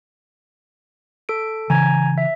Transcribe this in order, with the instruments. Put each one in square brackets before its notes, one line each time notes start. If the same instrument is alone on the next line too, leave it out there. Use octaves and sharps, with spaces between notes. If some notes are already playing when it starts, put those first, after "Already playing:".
[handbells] A4 D7
[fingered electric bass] C#3 E3 [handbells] G#5 A#5 G#6
[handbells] E5